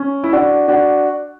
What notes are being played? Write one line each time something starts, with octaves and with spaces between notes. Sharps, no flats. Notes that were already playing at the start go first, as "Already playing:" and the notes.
Already playing: C#4
E4
D4 F#4
D4 F#4